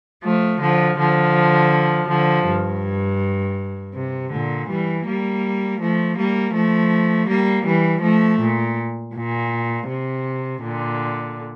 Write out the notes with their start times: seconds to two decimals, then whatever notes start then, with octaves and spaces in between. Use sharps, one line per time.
0.23 F3 A3
0.61 D3 F3
0.98 D3 F3
2.09 D3 F3
2.46 G2
3.95 C3
4.32 A#2 D3
4.70 E3 G3
5.06 G3 A#3
5.80 F3 A3
6.18 G3 A#3
6.55 F3 A3
7.29 G3 A#3
7.66 E3 G3
8.03 F3 A3
8.40 A#2
9.15 A#2
9.89 C3
10.63 A#2 D3